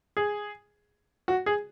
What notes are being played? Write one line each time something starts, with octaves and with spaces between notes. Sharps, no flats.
G#4
F#4
G#4